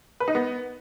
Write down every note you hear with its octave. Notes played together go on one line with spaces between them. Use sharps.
B4
D#4
B3